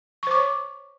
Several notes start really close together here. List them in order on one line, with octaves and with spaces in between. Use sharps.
C#6 C5 D6 C#5